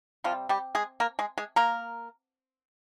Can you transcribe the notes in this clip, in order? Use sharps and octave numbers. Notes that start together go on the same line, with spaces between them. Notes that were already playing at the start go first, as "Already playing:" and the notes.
C3 F3 G3 C4 F4
G3 G4
G#3 G#4
A#3 A#4
G#3 G#4
G#3 G#4
A#3 A#4